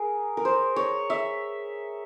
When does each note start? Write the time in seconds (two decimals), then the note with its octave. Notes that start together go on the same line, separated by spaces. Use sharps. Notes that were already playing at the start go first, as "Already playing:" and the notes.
Already playing: G#4 A#4
0.37 A#4
0.45 C5
0.76 C#5
1.10 E5